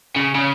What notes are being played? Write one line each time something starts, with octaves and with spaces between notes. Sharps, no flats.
C#3
C#3